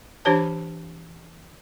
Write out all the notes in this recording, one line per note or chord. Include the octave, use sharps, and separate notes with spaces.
E3 D4 G4 C5 C#5 A5